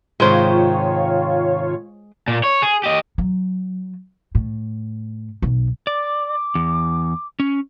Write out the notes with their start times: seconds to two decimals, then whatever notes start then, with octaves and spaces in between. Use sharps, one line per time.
0.20 G#2 C3 D#3 G#3 F4 C5 C#5
2.28 A#2
2.43 C#5
2.62 G#4
2.84 G4 D#5
3.18 F#3
4.35 A2
5.42 B1
5.87 D5 D6
6.55 E2
7.40 C#4